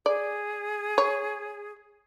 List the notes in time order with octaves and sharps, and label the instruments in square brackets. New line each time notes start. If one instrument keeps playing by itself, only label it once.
[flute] G#4 [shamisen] D5
[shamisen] C#5